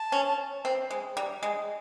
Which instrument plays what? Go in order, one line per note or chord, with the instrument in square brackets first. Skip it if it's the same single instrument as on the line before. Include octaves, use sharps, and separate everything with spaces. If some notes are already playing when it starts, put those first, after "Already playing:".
Already playing: [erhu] A5
[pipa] C#4
C4
G#3
G3
G#3